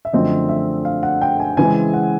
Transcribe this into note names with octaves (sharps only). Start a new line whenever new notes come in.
E5
F#2 D3 F3 A3 C4 D#5
E5
F5
F#5
G5
G#5
C#3 E3 G#3 C4 G#5
F#5